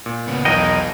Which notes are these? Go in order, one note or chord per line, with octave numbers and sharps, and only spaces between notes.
A#2
C#3 B3
B1 E2 F3 A#4 D#5 G5 G#5